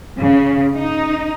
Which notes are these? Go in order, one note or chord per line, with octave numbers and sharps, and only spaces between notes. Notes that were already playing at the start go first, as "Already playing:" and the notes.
C#3
D#4